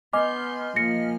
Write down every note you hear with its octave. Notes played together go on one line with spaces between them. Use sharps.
B3 D#5 G#5 C6 D6 F6 G6
F3 A#3 A#6 C#7